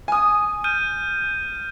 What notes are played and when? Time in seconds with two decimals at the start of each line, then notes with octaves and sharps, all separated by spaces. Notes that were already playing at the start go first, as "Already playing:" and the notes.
0.08 G#5 D#6
0.64 F6 G6 D#7